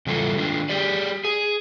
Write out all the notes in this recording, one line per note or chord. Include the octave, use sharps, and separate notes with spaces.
E2 C#3 G3 F4 A4
D#3 D4 F4
G4 G#4 D5
G#4